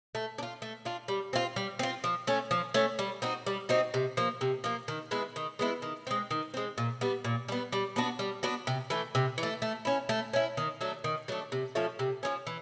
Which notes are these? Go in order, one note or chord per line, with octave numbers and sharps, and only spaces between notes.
A3
D4
F4
A3
D4 F4
G3
C4 F4
G3
C4 F4
F3
A3 C#4
F3
A3 C#4
G3
C4 D#4 F#4
G3
C4 D#4 F#4
C3
F3 A#3
C3
F3 A#3
D#3
G#3 B3 E4
D#3
G#3 B3 E4
D#3
G#3 C4
D#3
G#3 C4
A#2
G3 B3
A#2
G3 B3
G3
B3 D4 F#4
G3
B3 D4 F#4
C3
E3 A3
C3
E3
A3
A3
C#4 E4
A3
C#4 E4
D#3
F#3 A3 D4
D#3
F#3 A3 D4
C3
F3 A3 C#4
C3
F3 A3 C#4
E3